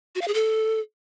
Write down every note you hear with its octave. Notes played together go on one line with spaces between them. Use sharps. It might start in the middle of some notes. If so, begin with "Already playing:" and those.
F#4
F5
G#4
A4